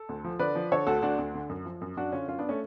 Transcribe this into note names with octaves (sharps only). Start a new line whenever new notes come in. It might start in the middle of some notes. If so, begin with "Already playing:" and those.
Already playing: A4
D2
F3
D3 B4 D5
F3
D3 A4 C#5
D2 F#4 A4
D2 D4 F#4
D2
D3
F#2
F3
F#2
F#2 D4 F#4
D3 C#4 F4
F#2 C#4 F4
B3 D4
A3 C#4